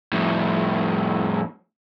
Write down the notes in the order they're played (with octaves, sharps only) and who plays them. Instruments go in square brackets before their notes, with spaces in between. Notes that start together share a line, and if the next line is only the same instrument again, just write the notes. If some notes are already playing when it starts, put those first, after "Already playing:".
[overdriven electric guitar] F2 A2